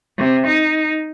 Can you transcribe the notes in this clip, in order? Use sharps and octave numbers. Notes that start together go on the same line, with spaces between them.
C3
D#4